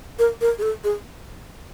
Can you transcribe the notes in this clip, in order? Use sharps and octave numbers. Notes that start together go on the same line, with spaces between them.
A#4
A#4
G#4
A4
G#4